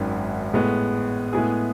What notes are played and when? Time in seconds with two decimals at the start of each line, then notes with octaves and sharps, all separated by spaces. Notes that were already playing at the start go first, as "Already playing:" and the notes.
Already playing: G#1 F#2 D#3
0.54 A2 G#3 B3
1.33 A2 G#3 B3 E4 G#4